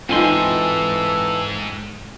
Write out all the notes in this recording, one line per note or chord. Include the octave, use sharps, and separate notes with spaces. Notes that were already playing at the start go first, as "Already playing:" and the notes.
G#2 E3 C4 D#4 F4 A4 G#5 C6